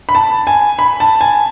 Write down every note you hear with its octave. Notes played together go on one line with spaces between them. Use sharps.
B5
A5
G#5
B5
A5
G#5